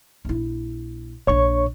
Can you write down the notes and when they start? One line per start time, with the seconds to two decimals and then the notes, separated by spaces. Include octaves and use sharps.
0.25 A#1 E4
1.27 A#1 D4 C#5 C#6